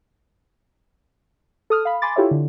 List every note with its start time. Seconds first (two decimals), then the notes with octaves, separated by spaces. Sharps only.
1.70 A4 D#6 F6
1.85 F5 B5
2.02 G#5 B5 C6 D6 A6
2.16 E4 F4 G4 A4 C#5 E5
2.31 D3